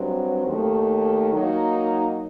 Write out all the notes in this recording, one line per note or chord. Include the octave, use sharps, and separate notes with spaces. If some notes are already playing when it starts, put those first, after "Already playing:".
Already playing: G2 F#3 C4
D#2 D#3 A3
F#3 A#3 D#4